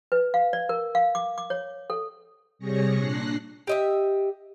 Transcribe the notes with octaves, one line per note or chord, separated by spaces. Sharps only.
B4
F5
D5
A#4
F5
D6
D6
C#5
A4
C3 G3 G#4 C#5 A#6 C#7
A#2 D4 F#6 A#6 C7
G4 D#5 E5